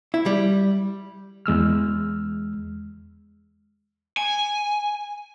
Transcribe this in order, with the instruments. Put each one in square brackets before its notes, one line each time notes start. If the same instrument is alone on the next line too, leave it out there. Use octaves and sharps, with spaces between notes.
[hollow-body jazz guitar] E4
G3
[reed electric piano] E2 G#3 E6 F6
[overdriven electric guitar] G#5